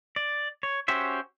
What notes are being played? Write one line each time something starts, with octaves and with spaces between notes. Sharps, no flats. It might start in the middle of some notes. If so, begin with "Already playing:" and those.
D5
C#5
C#4 F#4 G4 C5 E5